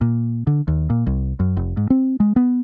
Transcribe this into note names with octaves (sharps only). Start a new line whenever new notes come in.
A#2
D3
D#2
A#2
C2
F#2
F1
G#2
C4
G#3
B3